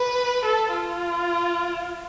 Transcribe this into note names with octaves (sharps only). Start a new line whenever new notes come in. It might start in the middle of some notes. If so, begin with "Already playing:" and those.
Already playing: B4
A4
F4